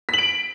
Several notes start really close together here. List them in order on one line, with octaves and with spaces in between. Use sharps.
B6 F#7 D7